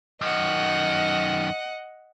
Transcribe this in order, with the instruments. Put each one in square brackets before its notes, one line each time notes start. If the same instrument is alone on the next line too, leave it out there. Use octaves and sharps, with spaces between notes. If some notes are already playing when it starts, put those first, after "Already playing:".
[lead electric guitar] F#2 D#3 [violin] D#5 F#5